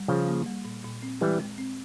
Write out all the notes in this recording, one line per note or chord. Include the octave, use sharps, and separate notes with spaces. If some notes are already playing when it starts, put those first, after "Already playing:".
Already playing: G3
C#3 F3 G#4
A#3
G3
A#2
A#2
C4
E3 G3 G#3
G#3
C4